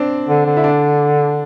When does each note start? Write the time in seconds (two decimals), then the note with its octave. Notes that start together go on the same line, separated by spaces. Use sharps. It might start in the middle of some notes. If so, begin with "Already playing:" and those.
Already playing: C4 D4
0.28 D3
0.46 D3
0.57 E4
0.64 D4